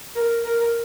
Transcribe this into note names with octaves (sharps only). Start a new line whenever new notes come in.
A#4
A#4